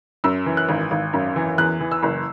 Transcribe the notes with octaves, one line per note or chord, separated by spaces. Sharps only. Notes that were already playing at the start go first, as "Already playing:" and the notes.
F#2 E6
E3
F#6
G#1
G#1
F#2
E3
E2 F#6
E3
E6
F#1